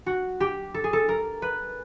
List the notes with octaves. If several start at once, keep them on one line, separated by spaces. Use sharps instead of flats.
F#4
G4
A4
G#4
A4
A#4
B4